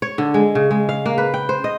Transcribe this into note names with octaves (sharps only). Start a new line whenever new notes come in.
C#5
D3
G#3
C#3
G#3
F5
A#3
B4
G5
C5
D#5